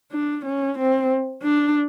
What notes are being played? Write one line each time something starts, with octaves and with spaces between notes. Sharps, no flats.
D4
C#4
C4
D4